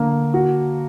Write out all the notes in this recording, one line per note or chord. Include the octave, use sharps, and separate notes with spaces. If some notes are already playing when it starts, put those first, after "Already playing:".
Already playing: D3 A#3
F#4